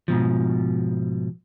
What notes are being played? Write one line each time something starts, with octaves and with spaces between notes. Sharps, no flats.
G#2 B2 F3